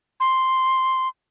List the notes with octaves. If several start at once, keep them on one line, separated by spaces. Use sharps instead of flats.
C6